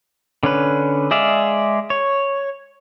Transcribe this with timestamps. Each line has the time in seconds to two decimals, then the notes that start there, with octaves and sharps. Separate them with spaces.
0.43 D3 C#4 B4
1.11 G#3 G#4 D5 E5 F5
1.90 C#5